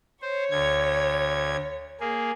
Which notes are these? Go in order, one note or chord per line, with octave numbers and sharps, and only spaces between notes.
C5 C#5
D2 G#6
A#3 G#4